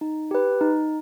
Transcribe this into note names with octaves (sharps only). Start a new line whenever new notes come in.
D#4
G4 B4
D#4